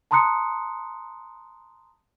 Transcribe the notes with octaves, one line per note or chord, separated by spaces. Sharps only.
A5 A#5 C6 D#6 F#6 C#7